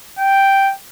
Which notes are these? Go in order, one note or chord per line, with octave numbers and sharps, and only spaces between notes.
G5